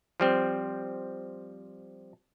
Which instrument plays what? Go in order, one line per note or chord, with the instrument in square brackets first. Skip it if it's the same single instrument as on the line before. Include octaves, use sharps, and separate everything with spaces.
[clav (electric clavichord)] F3 G3 C4